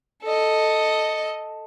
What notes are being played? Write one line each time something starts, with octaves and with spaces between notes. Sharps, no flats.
A4 D#5